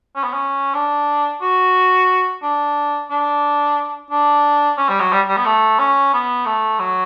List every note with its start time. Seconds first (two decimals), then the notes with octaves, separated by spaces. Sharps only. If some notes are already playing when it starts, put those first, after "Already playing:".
0.15 C#4
0.23 B3
0.33 C#4
0.74 D4
1.41 F#4
2.42 D4
3.11 D4
4.10 D4
4.78 C#4
4.89 G3
5.00 F#3
5.12 G3
5.28 G3
5.37 B3
5.45 A3
5.79 C#4
6.13 B3
6.46 A3
6.79 F#3